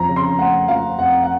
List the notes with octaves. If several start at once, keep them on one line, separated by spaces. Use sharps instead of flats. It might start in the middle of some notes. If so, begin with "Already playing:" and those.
Already playing: F2 F3 A#5
C#3
C6
A3 F#5
F3 F5
F2 F#5
F#5